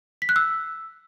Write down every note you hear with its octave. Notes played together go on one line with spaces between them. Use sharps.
B6
F#6
E6